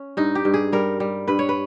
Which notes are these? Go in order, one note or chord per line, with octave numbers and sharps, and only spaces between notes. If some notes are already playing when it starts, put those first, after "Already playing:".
Already playing: C#4
G2 D#4
G4
G2
G#4
G3 A#4
G3
G2 B4
C#5
B4